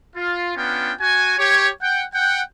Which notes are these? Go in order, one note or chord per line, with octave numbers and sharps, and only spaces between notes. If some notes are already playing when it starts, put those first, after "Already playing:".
F4
B3 C#4 D4 F4 G5
F#4 G#5
G4 C#5
F#5 G5
F#5 G5